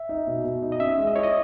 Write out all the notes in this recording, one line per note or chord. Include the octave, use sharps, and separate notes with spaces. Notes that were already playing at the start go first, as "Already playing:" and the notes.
Already playing: E5
D#4
B2
B2
D#4
D#5
C#4 E5
G#3
D#5
E4 C#5
D#5